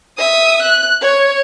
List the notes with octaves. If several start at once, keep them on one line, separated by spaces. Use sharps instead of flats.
E5 D#6
F#6
C#5